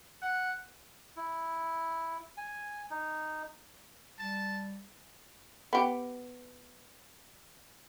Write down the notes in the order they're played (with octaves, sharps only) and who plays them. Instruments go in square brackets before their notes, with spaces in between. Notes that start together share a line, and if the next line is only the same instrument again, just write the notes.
[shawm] F#5
[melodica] E4
G#5
D#4
[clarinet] G3 [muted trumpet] A5
[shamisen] B3 G4